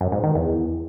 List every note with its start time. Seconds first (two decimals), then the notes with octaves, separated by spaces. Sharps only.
0.01 F#2
0.12 G#2
0.23 D#3
0.35 E2